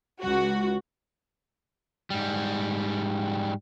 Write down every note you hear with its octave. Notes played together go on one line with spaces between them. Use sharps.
C#2 F#4
G#2 G3